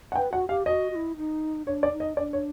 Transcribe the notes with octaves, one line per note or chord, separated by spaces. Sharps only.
F#5
B4 G5
F#4 F#5
G4 F5
F#4 D#5
F#4
E4
D#4
D4 C#5
D5
D#4
D#5
D4 D5
C#5